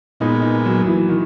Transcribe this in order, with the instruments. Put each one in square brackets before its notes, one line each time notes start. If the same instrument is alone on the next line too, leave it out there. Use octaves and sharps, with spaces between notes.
[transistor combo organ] A#2 G#3 B3 [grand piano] D#4
[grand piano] D#4
F#3
E3
D#3